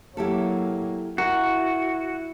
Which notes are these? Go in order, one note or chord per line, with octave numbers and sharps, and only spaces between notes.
F#3 A#3 E4 G4 A4
E4 F#4 A#4